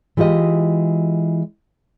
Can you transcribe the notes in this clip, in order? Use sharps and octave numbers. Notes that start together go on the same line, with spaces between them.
E3 G#3 F4 G4 D#5